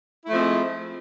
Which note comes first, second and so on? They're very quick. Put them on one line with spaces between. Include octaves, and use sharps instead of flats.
E4 A3 F3 C4 G#3